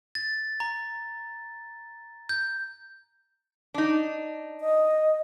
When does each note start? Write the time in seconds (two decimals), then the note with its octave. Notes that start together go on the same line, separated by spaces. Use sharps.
0.15 A6
0.60 A#5
2.29 G6
3.74 D4 D#4
4.61 D#5